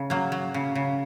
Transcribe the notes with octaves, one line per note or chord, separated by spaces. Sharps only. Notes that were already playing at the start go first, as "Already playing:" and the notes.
Already playing: C#3
F#3 A#3
F#3
C#3
C#3